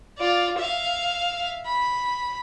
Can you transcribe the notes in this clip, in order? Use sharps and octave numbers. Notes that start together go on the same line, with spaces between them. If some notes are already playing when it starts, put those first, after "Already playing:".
F4 D5
E5 F5
B5